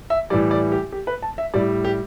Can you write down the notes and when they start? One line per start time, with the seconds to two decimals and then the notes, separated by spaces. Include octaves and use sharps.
0.10 E5
0.30 A2 E3 G3 D5
0.51 D5
0.72 G4
0.92 G4
1.07 B4
1.22 A5
1.38 E5
1.54 A2 G3 D5
1.84 G4